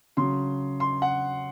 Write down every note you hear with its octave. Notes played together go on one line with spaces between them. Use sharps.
C#3 F#3 C6
C6
F#5